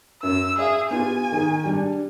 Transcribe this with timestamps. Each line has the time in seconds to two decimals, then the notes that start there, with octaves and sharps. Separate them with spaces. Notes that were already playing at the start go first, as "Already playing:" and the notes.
0.23 F#2 E6
0.59 G#4 E5 F5
0.91 B3 F4 G4 G#5
1.32 D#3 G#4
1.65 G3 D4